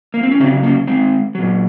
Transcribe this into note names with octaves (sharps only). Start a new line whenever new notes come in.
A#3
C4
C#4
C#3 F#3 C4 D#4
A#3 C#4
G#3 C4
A#2 F#3